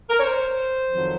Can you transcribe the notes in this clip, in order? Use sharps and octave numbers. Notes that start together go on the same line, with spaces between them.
A#4
C#5
C5
F2 D#3 F#3